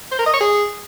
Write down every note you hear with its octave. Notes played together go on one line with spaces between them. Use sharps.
C5
A#4
D#5
C#5
G#4